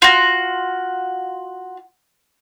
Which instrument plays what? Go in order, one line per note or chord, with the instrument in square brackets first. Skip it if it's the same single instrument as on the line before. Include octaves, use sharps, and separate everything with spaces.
[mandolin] F4 F#4